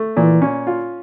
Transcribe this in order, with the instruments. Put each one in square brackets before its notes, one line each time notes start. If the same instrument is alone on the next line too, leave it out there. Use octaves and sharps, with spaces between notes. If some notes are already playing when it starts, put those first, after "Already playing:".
Already playing: [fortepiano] A3
[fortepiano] A#2 [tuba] E3
[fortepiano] C#4
F4